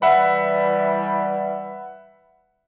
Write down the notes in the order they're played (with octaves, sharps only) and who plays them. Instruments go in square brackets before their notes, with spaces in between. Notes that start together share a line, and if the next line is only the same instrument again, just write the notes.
[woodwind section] E3 G3 [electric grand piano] E5 F#5 B5